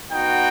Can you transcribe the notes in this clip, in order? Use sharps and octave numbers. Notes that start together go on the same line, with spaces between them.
B3 D#4 F#4 G5